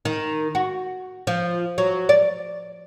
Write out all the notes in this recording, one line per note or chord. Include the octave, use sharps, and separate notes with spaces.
D#3
F#4
F3
F#3
D5